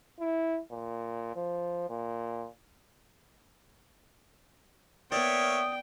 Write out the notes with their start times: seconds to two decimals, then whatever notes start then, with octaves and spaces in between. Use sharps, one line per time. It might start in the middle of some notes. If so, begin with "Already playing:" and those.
0.20 E4
0.71 A#2
1.36 F3
1.90 A#2
5.12 A#3 B3 C#5 D5 E5 G5 D#6